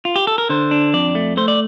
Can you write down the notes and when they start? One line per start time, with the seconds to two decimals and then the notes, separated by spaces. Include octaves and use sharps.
0.05 F4
0.16 G4
0.27 A4
0.38 A#4
0.49 D3 C5
0.71 D4
0.94 F2 D5
1.15 A3
1.37 A3 C5
1.48 D5